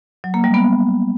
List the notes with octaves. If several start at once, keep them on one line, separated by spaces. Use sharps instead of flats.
F#3
A#3
G3
B3